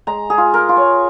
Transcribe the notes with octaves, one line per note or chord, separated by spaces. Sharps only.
G#3 A#5
G#4
F4
A#4
F4
C#5